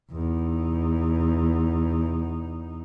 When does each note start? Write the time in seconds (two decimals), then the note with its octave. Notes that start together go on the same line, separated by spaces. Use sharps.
0.12 E2 D#4